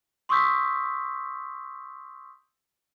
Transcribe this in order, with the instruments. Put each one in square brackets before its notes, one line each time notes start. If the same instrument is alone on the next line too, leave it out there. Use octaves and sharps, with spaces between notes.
[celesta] C6 C#6 D#6 E6 G6 B6